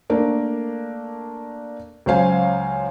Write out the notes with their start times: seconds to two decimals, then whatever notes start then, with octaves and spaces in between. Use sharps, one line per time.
0.10 A3 A#3 D4 A#4
2.06 C#2 F#3 C5 F5 G#5